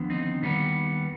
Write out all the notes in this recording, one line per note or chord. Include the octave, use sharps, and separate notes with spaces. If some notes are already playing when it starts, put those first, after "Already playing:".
Already playing: D#2 D3 F3 B3
C4 D#4
D#2 D#3 G3 B3